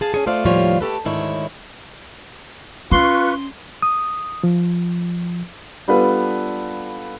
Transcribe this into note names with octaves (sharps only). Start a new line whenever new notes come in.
G#4 F5 A5
C#4 G#4
A3 F4 C5 D5 F5
D#2 A2 F3 G3 F4 C#5
A3 G4 A4 B4
D2 G#2 D#3 E4 C#5
C#4 F4 B4 C6 C#6
D#6
F3
G3 B3 D4 F4 A4 B4